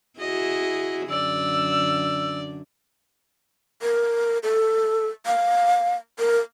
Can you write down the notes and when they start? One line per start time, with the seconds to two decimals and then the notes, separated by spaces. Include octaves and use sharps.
0.20 E4 F#4 G#4 D#5
1.10 F#2 D3 D5 E6
3.82 A#4
4.43 A4
5.26 F5
6.19 A#4